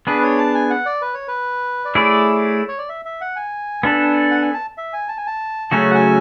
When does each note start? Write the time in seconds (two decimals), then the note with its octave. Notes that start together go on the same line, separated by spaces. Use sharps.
0.07 B3 D4 G#4 B4
0.23 C#5
0.39 A5
0.55 G#5
0.70 F#5
0.86 D5
1.02 B4
1.14 C#5
1.28 B4
1.85 D5
1.95 A3 E4 G#4 C#5 D5
2.68 C#5
2.79 D5
2.89 E5
3.05 E5
3.21 F#5
3.36 G#5
3.83 B3 D4 A4
4.31 F#5
4.42 G#5
4.54 A5
4.77 E5
4.93 G#5
5.08 A5
5.17 G#5
5.27 A5
5.71 C#3 F#3 A3 C#4 F#4 G#5
5.91 F#5
5.95 G#5